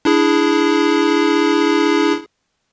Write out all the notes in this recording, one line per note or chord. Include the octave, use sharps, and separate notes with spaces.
D4 E4 G#4